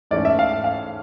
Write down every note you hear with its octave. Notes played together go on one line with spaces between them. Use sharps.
G#2 E3 A3 C#4 D5
E5
F5
F5